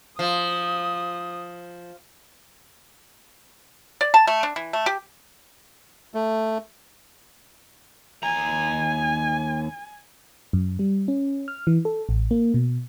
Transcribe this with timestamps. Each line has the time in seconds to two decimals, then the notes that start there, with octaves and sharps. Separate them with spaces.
0.19 F3 D#6
4.01 D5
4.14 A5
4.27 A3
4.43 D4
4.56 E3
4.73 A3
4.86 G4
6.14 A3
8.23 D#2 G#5 A#5
10.53 F#2
10.79 G3
11.08 C#4
11.48 F6
11.67 E3
11.85 A4
12.09 A1
12.31 A#3
12.54 B2